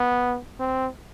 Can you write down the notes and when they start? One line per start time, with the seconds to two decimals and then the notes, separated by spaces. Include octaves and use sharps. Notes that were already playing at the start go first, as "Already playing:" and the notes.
Already playing: B3
0.59 C4